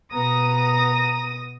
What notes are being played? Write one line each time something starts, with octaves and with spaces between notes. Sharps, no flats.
B2 B3 A#5 D#6 A#6